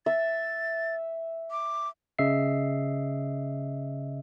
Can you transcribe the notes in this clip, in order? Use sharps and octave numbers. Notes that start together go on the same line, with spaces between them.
E5 A6
D6
C#3 D#5 E5 C7